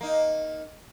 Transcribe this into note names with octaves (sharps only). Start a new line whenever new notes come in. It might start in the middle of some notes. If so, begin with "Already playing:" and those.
A#3 D#4